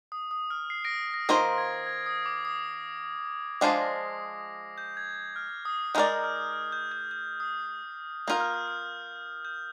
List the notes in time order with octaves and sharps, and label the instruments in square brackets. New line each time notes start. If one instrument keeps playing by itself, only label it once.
[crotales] D#6
D#6
F6
C7
A#6 D7
A#6
[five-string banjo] D#3 A#3 F4 C5 [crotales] A#6
[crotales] G#6
G#6
D#6
D6
D#6
[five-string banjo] F3 G#3 D4 F4 C5 [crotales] C7
[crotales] A#6
G6
G#6
F6
D#6
[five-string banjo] G#3 D#4 A#4 D5 [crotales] G6
[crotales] F6
F6
G6
G6
G6
D#6
[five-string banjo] A#3 F4 A#4 [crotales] G6
[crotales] F6
D#6
F6
G6